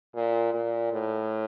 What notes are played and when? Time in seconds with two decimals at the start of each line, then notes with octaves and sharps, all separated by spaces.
0.15 A#2
0.54 A#2
0.92 A2